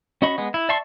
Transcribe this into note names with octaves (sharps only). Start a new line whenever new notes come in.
C#4 F#4 D#5 B5 C#6
G#3 B3
E4
D5 E5 A5 C6 C#6